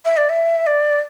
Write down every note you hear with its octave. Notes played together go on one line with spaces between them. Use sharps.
E5
D5
E5
D5